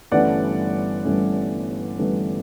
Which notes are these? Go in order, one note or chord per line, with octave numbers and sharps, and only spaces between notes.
G1 G2 E3 A3 C#4 D5 F#5
G1 G2 E3 A3 C#4
G1 G2 E3 A3 C#4